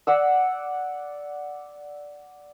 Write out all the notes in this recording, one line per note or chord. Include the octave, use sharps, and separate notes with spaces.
D5 F#5 E6